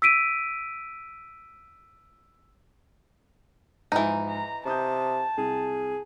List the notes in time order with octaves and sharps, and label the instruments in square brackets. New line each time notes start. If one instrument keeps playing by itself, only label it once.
[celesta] E6 B6 D7 D#7
[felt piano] G#2 F3 G#3 [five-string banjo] E3 D#4
[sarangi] A#5
[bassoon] C3 [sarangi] A5 [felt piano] A#5 D#6 G6
[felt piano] C2 [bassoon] G#4